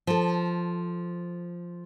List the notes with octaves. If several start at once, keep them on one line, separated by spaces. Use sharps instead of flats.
F3 A4